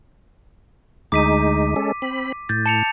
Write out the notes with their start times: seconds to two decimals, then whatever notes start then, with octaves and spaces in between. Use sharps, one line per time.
1.12 D2 G#3 D#4 D6 B6 D#7
1.76 G#3 C#4 A4
2.02 C4 B5
2.49 A2 G6 A6
2.66 A5 C#7 F7